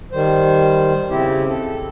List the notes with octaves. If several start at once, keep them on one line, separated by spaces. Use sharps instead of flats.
D#3 G3 C5
C#3 C4 E4 G4
A4